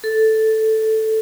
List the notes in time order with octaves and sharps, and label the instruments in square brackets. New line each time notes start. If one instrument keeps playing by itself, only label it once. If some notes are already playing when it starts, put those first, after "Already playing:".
[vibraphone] A4